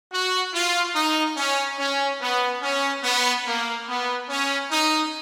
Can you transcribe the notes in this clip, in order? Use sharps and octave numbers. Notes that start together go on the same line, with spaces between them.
F#4
F4
D#4
C#4
C#4
B3
C#4
B3
A#3
B3
C#4
D#4